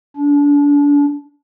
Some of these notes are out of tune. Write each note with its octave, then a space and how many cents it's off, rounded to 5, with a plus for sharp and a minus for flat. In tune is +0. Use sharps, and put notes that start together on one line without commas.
D4 -30